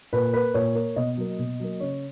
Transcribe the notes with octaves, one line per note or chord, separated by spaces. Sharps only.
A#2 B4
A#3 B4
A#2 C#5
A#3
B2 D#5
F#3 A#3
B2
F#3 A#3
C#3 C#5